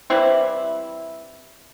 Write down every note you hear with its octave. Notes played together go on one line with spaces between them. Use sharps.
E3 G3 C4 E4